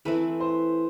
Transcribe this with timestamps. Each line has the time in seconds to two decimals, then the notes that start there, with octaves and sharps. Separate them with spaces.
0.05 E3 A3 C4 E4 B4
0.40 C5